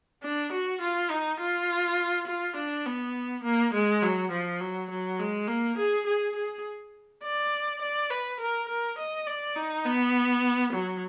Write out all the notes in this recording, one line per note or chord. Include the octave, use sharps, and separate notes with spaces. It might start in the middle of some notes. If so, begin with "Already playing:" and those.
D4
F#4
F4
D#4
F4
F4
D4
B3
A#3
G#3
F#3
F3
F#3
F#3
G#3
A#3
G#4
G#4
G#4
D5
D5
B4
A#4
A#4
D#5
D5
D#4
B3
F#3